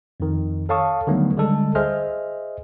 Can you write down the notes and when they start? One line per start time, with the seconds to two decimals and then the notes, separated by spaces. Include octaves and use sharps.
0.20 F2 D#3
0.69 A4 C#5 F5 A5 C#6 D#6
1.07 D3 D#3 F#3 G3 A3 B3
1.37 D3 G3 G#3 A4
1.75 G#4 C5 D#5 E5 F6